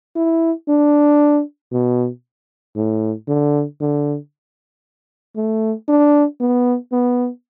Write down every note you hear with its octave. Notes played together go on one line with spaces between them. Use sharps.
E4
D4
B2
A2
D3
D3
A3
D4
B3
B3